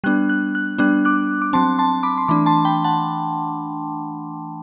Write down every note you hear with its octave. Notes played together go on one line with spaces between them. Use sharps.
G3 B3 D4 F#6
F#6
F#6
G3 B3 D4 F#6
D6 F#6
D6
F#3 C4 A5 C6
A5 C6
B5 D6
C6
E3 A3 D4 B5 D6
A5 C6
G5 B5
F#5 A5